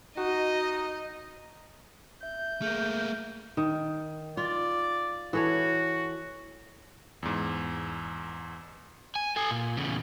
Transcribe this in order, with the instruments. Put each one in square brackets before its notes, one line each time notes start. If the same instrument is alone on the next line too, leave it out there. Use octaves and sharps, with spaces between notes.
[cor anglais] D#4 [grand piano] F#4 [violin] D#5
[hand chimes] E5 [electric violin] G6
[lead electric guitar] A3 A#3 [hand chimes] G#4 E5 F6
[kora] D#3
[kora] F4 [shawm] D5
[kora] E3 A4 C#5 [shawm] F#4
[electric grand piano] E2 G#2
[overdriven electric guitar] G#5
A4 G#5
A#2
E2 C#3